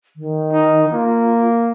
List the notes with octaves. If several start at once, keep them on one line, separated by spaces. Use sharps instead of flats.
D#3
D#4
A#3 F4